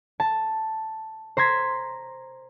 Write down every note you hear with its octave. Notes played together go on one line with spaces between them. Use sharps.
A5
C5 A#5 C6 G#6 B6